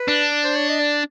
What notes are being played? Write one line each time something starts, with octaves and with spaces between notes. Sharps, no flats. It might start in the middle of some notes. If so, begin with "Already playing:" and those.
Already playing: B4
D4
C5
C#5
D#5
D5